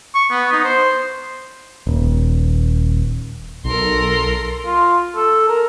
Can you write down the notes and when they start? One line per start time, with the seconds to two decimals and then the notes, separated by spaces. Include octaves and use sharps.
0.15 C#6
0.31 B3
0.52 D#4
0.64 C5
1.87 D#1
3.64 B1 A4 A#4 C6
4.66 F4
5.16 A4
5.49 A#4